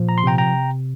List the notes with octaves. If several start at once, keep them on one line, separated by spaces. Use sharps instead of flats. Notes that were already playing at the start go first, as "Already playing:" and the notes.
Already playing: A#2 F3
A#5
C6
C3 G5 A#5
G5 A#5